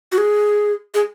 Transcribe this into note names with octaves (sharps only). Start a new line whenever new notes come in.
F#4
G#4
G#4